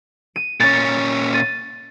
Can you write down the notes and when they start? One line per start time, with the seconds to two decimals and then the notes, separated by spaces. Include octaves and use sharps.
0.36 D#7
0.60 A#2 C#4 A6
1.33 A6 D#7